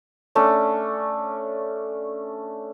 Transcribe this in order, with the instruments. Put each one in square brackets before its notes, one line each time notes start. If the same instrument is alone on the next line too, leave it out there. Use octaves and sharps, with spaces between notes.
[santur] A3 C#4 D4